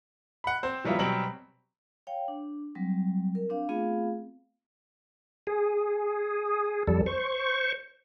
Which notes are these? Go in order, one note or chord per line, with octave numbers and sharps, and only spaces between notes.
F#5 B5
C4 C5
E3 F#3 G3 B3 E4 F4
B2 F#3 G3 C4 D7 F#7
C#5 F5 G5
D4
F#3 G3 C4
A#4
C4 D4 F5
A3 B3 C4 F4 G#4 F5
G#4
F2 G3 A4
C5 C#6